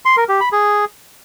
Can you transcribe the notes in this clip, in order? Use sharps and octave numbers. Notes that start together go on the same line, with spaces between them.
C6
A#4
G4
B5
G#4